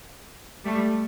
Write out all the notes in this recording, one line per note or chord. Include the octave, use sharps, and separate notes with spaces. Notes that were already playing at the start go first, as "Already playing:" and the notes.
G3 A3